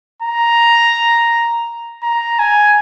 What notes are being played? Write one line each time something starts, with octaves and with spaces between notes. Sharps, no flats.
A#5
A#5
G#5